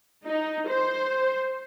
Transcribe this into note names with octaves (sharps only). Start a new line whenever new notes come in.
D#4
C5